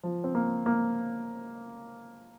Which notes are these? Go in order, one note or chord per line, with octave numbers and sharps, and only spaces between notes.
F3
C4
A#3
A#3